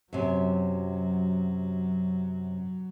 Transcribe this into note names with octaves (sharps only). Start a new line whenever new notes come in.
F#2 C3 F#3